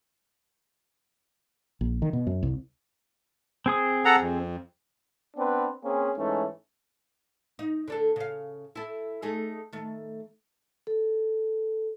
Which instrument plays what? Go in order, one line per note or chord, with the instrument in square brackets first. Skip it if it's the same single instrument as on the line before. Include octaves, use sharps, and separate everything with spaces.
[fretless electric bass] A#1
D#3
B2
F#2
C2
[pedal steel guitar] C4 G#4 D#6
[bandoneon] A4 F#5 A#5
F2
[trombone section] B3 C4 D4 B4
A#3 C4 C#4 G#4
G#2 E3 A3 C#4
[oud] D#4
D3 D4 A4
C#3 F5
E4 A4
A3 D#4 G#4
D#3 A3
[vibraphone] A4